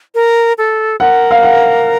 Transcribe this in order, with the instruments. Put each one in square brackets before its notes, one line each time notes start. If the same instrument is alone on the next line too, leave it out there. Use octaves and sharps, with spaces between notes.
[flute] A#4
A4
[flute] A#4 [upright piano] F#5
[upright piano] F5
F#5